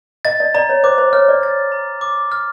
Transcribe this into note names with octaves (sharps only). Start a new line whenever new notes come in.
D#5 A6
D5
D5 A#5
C#5
C5 D6
C5
C#5 F6
D5
A6
A#5
D6
F6